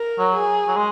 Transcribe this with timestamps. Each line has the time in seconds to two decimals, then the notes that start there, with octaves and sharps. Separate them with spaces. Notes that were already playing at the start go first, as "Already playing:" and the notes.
Already playing: A#4
0.18 F#3
0.34 G#4
0.67 F#3
0.76 G#3